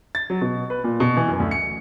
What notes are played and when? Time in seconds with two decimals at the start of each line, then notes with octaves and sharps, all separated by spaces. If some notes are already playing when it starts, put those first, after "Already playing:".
0.15 A6
0.30 F#3
0.41 B2
0.70 B4
0.84 A#2
1.00 B2
1.17 E3
1.28 F#2
1.40 D2
1.51 C#7